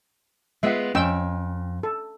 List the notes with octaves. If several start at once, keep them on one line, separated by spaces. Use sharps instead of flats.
G#3 B3 F4 E5 F#5
F2 C#4 G5 E6
A4